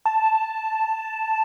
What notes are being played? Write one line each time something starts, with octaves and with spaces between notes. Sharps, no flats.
A5